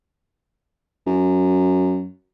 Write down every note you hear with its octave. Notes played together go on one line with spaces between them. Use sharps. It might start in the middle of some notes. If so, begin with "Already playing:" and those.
F#2